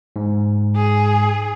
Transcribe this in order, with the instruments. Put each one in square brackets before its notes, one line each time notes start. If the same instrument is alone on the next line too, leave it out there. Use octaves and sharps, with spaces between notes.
[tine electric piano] G#2
[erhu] G#4